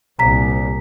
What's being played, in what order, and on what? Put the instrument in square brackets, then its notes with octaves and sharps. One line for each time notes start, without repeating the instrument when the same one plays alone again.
[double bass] C2 A#2 [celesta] A#5 B6